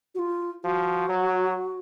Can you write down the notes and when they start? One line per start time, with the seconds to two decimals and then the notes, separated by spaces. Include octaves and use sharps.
0.15 F#4
0.19 F4
0.64 F3 F#4
1.09 F#3